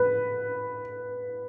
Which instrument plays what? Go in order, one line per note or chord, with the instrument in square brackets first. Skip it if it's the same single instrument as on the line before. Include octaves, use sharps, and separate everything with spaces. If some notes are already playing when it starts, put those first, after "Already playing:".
Already playing: [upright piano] B4